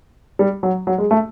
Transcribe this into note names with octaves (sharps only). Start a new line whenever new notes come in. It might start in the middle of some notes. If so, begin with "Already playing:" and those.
G3
F#3
F#3
G#3
A3